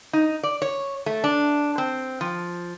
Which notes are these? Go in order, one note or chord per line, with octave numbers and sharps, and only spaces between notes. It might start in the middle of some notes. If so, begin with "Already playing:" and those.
D#4
D5
C#5
A3
D4
C4
F3